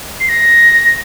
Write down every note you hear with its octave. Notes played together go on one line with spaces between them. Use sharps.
C7
A#6